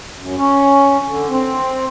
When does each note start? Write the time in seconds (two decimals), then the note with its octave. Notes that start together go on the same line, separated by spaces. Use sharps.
0.18 F#2
0.37 C#4
1.08 D3
1.29 C4